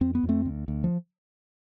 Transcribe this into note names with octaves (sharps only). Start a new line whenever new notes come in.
F2 C4
B3
F2
A3 C4
D2
D2
F3